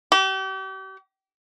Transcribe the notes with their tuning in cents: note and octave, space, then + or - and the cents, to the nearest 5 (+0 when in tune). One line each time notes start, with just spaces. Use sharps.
G4 -40